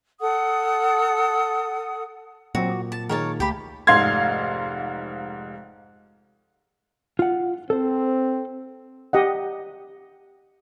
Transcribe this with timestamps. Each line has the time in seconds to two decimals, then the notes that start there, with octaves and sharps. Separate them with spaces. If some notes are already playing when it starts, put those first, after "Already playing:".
0.21 A4 F#5 D#6
2.55 A#2 F#3 C4 F#4
2.69 D6
2.92 A5
3.09 D#3 A#3 G#4 A#4 C#5 A5
3.40 C#2 A3 G4 B5
3.87 F1 G#2 F5 C6 G#6
7.19 F4 F#5
7.70 C4 A4 C5
9.13 G4 D#5 F#5